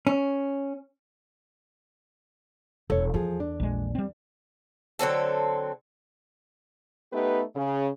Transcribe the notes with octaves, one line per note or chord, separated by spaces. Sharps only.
C#4
E1 A4 C#5
E2 F3 G#4
D4
A#1 G#3
G3 C4
D3 F#3 C4 A4
A3 B3 D#4 G4 B4
C#3